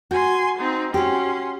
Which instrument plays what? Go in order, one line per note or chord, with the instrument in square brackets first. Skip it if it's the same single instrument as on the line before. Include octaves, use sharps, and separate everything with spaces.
[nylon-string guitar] F#4 [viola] G#5 C6
[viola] C4 D#4
[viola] C#4 C6 [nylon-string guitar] F#4 G4